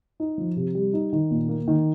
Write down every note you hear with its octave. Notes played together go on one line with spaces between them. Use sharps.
D#4
F3
C3
G3
D#4
D#3
A#2
A#3
D#3